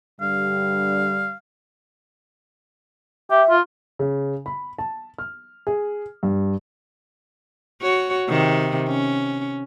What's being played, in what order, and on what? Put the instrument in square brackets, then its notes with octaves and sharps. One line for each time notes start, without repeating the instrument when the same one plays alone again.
[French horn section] G2 D3 G3 [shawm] F5
[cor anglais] G4 [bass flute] E5
[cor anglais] F4
[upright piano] C#3
B5
A5
F6
G#4
G2
[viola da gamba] F#4 C#5
C3 D#3
C#4